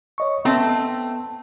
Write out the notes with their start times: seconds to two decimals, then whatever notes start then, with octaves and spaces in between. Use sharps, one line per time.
0.18 C#5 D#5 C#6
0.45 A3 B3 C4 A5